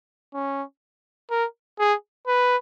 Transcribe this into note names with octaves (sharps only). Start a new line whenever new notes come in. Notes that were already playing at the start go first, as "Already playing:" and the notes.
C#4
A#4
G#4
B4